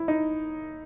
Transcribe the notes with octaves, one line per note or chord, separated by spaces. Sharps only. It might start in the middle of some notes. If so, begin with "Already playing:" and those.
Already playing: E4
D#4